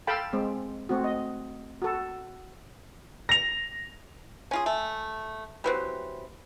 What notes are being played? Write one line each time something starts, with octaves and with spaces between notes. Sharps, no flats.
A4 F5 G5 A5 B5
G#3 C4
A3 C4 F#4
D#5
F#4 A4
A#6 F7
C#4 F4 G#4 G#5
A3
E3 F#3 C4 G4 B4